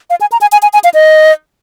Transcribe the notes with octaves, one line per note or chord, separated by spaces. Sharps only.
F5
G#5
A#5
G#5
G#5
G#5
G#5
F5
D#5